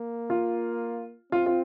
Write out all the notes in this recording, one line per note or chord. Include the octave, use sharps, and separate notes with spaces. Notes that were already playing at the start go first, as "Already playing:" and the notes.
Already playing: A#3
F4
C4 F4
F4